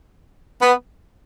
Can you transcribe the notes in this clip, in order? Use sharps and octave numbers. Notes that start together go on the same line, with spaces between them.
B3